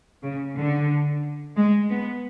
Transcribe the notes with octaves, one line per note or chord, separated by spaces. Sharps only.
C#3
D3
G#3
B3